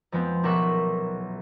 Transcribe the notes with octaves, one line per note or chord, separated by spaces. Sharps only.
F2 F3 G#3 B3 C4
D#1 B1 A#4 E5 F#5 C#6